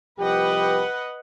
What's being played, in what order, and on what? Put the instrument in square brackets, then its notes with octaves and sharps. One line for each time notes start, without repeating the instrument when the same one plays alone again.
[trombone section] C2 F3 G4 [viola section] B4 D#5 F#5